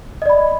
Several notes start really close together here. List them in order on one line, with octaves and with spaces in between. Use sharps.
D#5 D5 B5